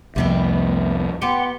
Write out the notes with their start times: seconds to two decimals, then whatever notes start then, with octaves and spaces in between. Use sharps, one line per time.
0.16 C2 F2 C3 A3 B3 E4
1.22 B3 G4 F#5 C6